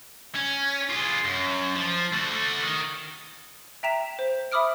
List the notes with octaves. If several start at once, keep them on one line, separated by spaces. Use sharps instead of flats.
C#4
F4 G#4
F#2
F3
A3 F#4
D#3
E5 G5 A#5 B6 E7
C5
E5 B5 D6 D#6 F6 D7